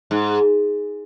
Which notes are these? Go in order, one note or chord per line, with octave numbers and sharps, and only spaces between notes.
G#2